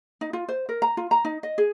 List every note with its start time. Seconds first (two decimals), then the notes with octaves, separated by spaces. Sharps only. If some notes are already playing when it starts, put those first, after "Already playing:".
0.21 D#4
0.33 F4
0.49 C5
0.69 A#4
0.82 A#5
0.97 F4
1.11 A#5
1.25 D#4
1.43 D#5
1.58 G#4